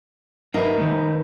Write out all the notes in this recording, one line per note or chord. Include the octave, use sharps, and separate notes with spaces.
D#4 A#4 B4 E5 F5
D#3 A3